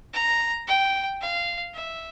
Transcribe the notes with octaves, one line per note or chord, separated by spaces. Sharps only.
A#5
G5
F5
E5